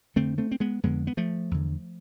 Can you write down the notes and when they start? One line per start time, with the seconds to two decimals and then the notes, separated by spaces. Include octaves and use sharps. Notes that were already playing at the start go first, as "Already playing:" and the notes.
0.16 F2 D3 A3 C4
0.38 A3 C4
0.51 C4
0.60 G#3 B3
0.83 F2 D3 G#3 B3
1.07 B3
1.17 F3 A3
1.51 E2 D3